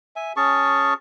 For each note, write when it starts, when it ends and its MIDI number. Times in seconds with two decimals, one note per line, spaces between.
0.16 0.33 76
0.16 0.33 80
0.36 0.94 61
0.36 0.94 68
0.36 0.94 81
0.36 0.94 85